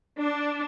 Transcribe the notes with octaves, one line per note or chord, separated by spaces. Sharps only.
D4